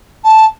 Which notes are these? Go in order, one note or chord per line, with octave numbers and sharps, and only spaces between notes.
A5